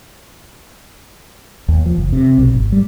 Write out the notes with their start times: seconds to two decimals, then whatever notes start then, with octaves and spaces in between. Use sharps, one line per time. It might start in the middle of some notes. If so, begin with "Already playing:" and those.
1.68 D#2
1.86 F3
1.98 F#1
2.13 C3
2.38 B1
2.55 G#1
2.72 G3